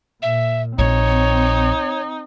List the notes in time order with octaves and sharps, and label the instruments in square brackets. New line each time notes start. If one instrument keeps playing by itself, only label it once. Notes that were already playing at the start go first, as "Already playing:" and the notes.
[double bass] A#2 [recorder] E5
[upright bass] A#1 [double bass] C4 [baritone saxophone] D#4 [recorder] C#5